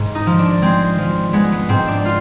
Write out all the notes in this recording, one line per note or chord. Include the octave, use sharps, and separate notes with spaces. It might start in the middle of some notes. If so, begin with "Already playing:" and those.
Already playing: G#2
D#4
F3
D4
G#3 C4
F3
G#3 B3
B3
G#2 C4
D4
F4